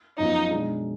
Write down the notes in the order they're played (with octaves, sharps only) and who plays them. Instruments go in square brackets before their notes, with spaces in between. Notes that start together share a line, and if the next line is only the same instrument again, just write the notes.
[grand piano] F#2 F3 B3 [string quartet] D#4
[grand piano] B2 G#3 D4